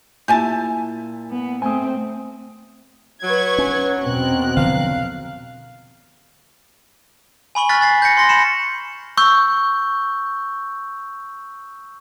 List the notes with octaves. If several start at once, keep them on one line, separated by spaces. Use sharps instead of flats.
A#2 E4 G4 G#5 A5
B3
A3 C4 G#5 D#6
F#3 B4 C#6 G#6
C#4
E2 B2 C4 A#4 F#6
D3 F3 F#3 F5
G#5 B5 C#6 F#7
C#6 F6 F#6 A6 B6
G#5 A6 C7
G6 A6 A#6 C#7
C6 A#6
B5 C#7 E7
C#6 E6 G6